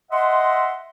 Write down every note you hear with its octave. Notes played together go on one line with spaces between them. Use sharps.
D#5 E5 F#5 C6